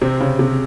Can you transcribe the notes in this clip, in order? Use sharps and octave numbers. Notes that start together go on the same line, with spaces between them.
C3 C4
C#3
C3